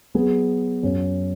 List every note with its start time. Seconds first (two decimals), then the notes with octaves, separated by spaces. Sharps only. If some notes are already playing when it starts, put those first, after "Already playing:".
0.14 F#3 B3 G#4
0.83 F#2 F#3 C#4